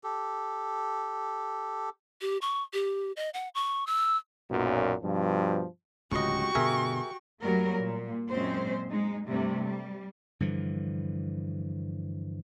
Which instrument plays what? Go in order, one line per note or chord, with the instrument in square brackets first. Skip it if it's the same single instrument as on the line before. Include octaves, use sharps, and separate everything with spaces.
[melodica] G4 A4
[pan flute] G4
C#6
G4
D#5
F#5
C#6
E6
[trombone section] B1 F#2 A#2
G2 B2 F3
[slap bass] D1 C#4 [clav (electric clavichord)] C#2 D#5 [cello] F#4 G4 [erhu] C#6
[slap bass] G2 B2 D3 [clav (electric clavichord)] G#4 A#4 E5
[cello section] F#2 F#3 G3 A3 A#3 A#4
A#2
F#2 A#2 G#3 C4 C#4 C5
G#3 D#4
G2 C3 G3 A3
G3
[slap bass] G2 D3 E3 F3